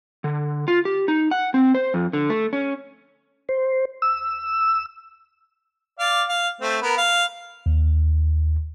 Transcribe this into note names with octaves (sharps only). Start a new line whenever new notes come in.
D3
F4
G4
D#4
F#5
C4
C5
F2
D3
A3
C#4
C5
E6
D5 F5
F5
A3 C4
B3 A#4
F5
D#2